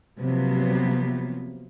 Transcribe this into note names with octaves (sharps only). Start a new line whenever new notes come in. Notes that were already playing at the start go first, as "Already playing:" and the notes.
C3 F3 F#3 A#3 B3